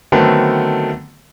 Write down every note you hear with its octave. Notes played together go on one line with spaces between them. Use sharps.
D3 D#3 F#3 A3 B3 C4